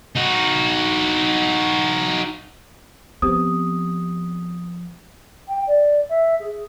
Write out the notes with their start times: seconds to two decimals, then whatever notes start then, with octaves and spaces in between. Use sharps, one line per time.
0.16 D#4 F#4
3.22 F3 B3 C4 G4 D#6
5.48 G5
5.67 D5
6.09 E5
6.40 G#4